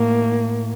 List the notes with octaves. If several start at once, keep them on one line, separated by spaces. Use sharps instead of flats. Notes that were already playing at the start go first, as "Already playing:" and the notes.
Already playing: A2 A#3